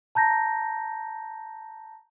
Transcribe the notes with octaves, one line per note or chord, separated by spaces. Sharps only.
A5 A#5 G6 A#6